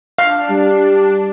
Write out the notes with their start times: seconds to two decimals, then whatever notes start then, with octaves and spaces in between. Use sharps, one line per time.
0.18 D4 F5
0.50 G3